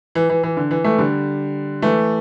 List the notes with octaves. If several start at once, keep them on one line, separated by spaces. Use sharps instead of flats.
E3
E3
E3
D3
E3
E3 A3
D3 G3
E3 A3